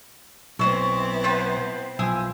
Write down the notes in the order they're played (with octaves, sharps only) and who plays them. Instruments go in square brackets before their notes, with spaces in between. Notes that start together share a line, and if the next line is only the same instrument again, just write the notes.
[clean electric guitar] B1 [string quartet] B3 C4 E4 [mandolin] A4 C5 D#5 [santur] C#5
[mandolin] B4 F#5 A5 [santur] C5 G5
[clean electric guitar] B1 F3 [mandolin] E4 G#4 G#5